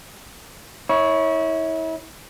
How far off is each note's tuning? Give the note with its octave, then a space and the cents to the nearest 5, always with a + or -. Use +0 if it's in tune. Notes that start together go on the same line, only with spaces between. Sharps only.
E4 -35 C#5 +0